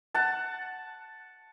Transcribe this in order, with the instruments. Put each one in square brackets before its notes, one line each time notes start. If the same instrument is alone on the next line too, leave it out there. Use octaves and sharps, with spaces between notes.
[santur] F#5 A5